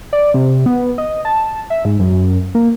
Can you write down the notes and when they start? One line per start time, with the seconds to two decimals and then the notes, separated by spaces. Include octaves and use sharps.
0.13 D5
0.34 C3
0.66 B3
0.98 D#5
1.25 A5
1.70 E5
1.85 G#2
1.99 F#2
2.55 A#3